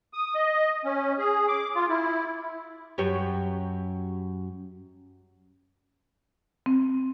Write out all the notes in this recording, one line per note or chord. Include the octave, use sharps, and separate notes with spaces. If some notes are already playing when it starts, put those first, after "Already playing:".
D#6
D#5
C#4
G#4
D6
F4
E4
F#2 G4 C#5
C4